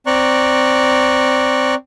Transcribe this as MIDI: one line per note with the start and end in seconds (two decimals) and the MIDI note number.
0.06 1.75 60
0.06 1.75 74
0.06 1.75 82
0.06 1.75 85
0.06 1.75 90